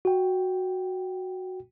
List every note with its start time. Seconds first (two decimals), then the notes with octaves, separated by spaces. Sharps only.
0.05 F#4 G5